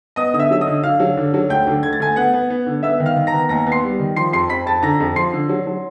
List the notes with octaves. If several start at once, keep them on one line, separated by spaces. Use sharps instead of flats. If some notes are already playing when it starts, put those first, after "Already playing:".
B3 D#5 D#6
D3 D#6
E5 E6
F#3 E6
D#5 D#6
D3
D3 F5 F6
F#3
D3
F#3
D2 G5 G6
D3
D2 G#6
A6
D2 G#5 G#6
B3 F#5 F#6
B3
B3
D3
B3 E5 E6
D#3
F5 F6
D#3
A#5 A#6
B3
D#2 A#5 A#6
B3
C6 C7
G3
D#3
F3 C6 C7
F2 C6 C7
F2 B5 B6
F2 A5 A6
D3 A#5 A#6
F2
F3 C6 C7
D3
F#3
F#3